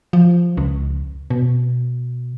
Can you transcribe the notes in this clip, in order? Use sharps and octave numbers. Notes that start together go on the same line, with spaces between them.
F3
C#2
B2